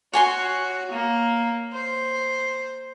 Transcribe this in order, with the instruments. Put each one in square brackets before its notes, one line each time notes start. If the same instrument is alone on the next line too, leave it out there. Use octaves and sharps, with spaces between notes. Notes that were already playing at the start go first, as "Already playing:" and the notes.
[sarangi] F#4 [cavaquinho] C#5 G#5 C6
[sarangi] A#3
C5